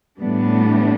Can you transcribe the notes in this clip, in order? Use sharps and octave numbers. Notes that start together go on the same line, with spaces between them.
A2 E3 G3 B3 D4